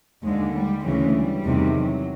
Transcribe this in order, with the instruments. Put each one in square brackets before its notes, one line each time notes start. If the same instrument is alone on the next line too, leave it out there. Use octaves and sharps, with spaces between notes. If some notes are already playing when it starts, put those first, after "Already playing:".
[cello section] D#2 D3 G#3
G3
D2 C#3 E3 G#3
G3
E2 C3 D#3
F#3